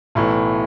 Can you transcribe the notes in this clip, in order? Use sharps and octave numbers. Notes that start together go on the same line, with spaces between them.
B1 A2 E3